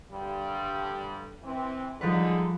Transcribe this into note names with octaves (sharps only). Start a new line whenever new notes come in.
G2 D3 G3
E3 C4
D3 F3 G3 G#3 D#4 B4